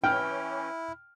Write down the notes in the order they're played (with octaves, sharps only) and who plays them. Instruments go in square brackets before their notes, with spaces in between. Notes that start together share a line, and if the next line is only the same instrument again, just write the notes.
[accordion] E3 C#4 [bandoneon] E4 [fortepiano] G5 [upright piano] F6